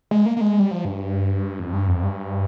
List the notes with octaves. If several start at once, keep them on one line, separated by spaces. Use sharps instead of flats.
G#3
A#3
A#3
G#3
G3
F3
G2
F2
G2
F2
G2